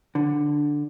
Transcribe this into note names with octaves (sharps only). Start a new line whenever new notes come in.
D3